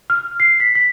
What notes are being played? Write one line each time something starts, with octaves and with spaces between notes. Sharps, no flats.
F6
C7
B6
B6